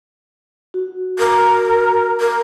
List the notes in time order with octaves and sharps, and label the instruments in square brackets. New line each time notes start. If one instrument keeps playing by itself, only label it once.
[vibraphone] F#4
[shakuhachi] A#4
A#4